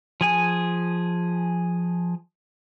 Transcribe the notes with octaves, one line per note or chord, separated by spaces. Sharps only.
F3 G#4 G#5